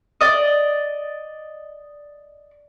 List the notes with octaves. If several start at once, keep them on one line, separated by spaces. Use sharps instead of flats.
D5 D#5